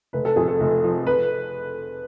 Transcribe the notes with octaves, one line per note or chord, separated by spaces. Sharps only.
F1 B4
A4
F2 G#4
A4
F1
F3
B4